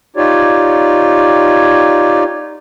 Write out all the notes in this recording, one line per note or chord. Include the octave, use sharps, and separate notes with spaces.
D#4 F4 G4 C#5 D5